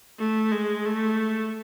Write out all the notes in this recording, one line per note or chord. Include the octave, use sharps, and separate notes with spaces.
A3
G#3
A3